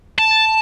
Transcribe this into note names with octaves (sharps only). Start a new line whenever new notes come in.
A5